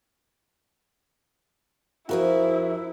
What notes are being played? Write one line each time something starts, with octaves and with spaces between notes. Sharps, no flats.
F2 F3 E4 F#4 G#4 A#4